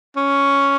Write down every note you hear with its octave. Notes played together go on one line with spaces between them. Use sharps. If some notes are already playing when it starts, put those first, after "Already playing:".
C#4